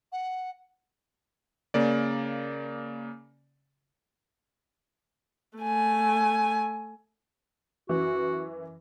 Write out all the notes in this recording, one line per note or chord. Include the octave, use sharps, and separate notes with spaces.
F#5
C#3 A#3 D5
A3 G#5
F#2 E3 F#4